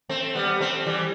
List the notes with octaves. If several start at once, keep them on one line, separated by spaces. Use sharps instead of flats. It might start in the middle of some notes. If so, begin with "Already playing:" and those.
A3 C4
G3 B3
A3 C4
E3 G3